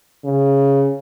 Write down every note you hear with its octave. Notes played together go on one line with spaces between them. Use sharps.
C#3